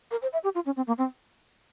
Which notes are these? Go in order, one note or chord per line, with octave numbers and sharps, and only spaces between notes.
A#4
C5
E5
G4
F4
C#4
C4
A#3
C4